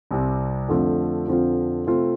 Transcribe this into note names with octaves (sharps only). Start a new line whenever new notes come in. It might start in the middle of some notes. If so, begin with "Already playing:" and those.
C2 C3 G3
F2 D3 F3 A3
F2 D3 F3 C4 F4
C3 A3 C4 F4